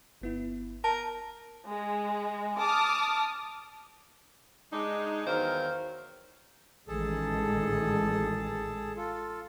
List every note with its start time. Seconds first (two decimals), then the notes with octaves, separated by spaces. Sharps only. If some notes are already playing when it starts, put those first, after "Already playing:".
0.21 G1 B3 E4
0.84 A#4 A5
1.68 G#3
2.58 A5 D6 D#6 F6
4.73 G#3 D4 D#4
5.26 E2 D#3 F#3 A#4 C5 F5
6.88 A1 D#3 G#3 G#4 A4 A5
8.97 F4 A4